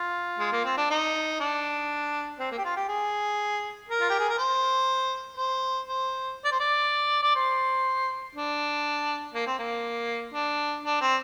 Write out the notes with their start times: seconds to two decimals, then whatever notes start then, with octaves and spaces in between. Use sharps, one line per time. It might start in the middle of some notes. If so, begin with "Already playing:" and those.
Already playing: F4
0.39 G#3
0.52 A#3
0.65 C4
0.77 D4
0.91 D#4
1.40 D4
2.39 C4
2.52 A#3
2.58 G4
2.65 F4
2.76 G4
2.89 G#4
3.89 A#4
4.01 F4
4.10 G4
4.20 G#4
4.29 A#4
4.38 C5
5.37 C5
5.88 C5
6.45 D5
6.52 C5
6.60 D5
7.23 D5
7.36 C5
8.35 D4
9.35 A#3
9.46 C4
9.59 A#3
10.34 D4
10.84 D4
11.01 C4